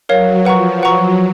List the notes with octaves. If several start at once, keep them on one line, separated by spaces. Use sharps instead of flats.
F#3 A#4 C#5 F5
F3 B4 F#5 A#5 C#6
F#3 B4 F#5 A#5 C#6